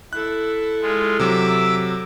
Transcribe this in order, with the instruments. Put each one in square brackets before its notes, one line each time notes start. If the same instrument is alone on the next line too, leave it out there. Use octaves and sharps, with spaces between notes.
[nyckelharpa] E4 A4 [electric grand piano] F#6
[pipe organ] G#3 F4
[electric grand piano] C3 F#3 [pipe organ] E5 D6 E6